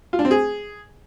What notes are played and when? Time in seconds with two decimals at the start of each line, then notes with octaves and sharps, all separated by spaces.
0.13 F4
0.19 D4
0.25 C4
0.31 G#4